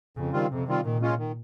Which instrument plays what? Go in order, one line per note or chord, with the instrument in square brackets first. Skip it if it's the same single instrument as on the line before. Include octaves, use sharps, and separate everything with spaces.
[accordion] F2 [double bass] C#3
[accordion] D#3 G3 C4 F4
[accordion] F2 [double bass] C3
[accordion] D#3 G3 C4 F4
[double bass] A#2 [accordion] D#3
[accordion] G#3 C#4 F4
D#3